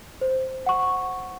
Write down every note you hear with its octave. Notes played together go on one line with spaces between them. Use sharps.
C5
F#5 C#6